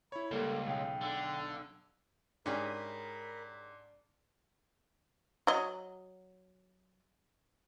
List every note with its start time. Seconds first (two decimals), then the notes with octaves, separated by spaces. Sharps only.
0.12 E4 C#5 B5
0.31 C#2 G3 A#3 A4
0.67 B1 G#4 F5 G5
1.01 D3
2.46 G#2 C#4 D4 G4 G#4 A#4 B5
5.47 F#3 D#5